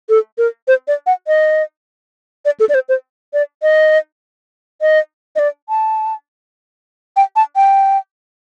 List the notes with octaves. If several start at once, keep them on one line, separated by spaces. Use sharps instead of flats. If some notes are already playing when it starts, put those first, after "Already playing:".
A4
A#4
C5
D5
F#5
D#5
D5
A4
D5
C5
C5
D5
D#5
D#5
D#5
D5
A5
G5
A5
G5